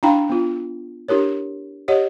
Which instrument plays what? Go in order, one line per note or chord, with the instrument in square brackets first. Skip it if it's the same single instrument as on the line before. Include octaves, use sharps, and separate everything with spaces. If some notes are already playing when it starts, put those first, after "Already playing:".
[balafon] D4 E4 F5 G5 A#5 B5
B3 F4
D4 E4 G4 A#4 C#5
G4 C#5 D#5 F#5